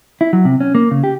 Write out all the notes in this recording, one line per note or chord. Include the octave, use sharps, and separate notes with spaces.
E4
F#3
C3
C#4
A#3
C#3
G4